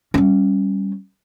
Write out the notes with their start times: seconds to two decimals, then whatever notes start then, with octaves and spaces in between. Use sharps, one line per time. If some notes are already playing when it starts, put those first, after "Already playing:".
0.14 G3 C#4